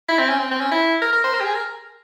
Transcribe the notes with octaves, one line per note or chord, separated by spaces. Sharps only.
E4
C4
C#4
C4
C4
C#4
E4
A#4
A#4
C5
A#4
G4
G#4
A#4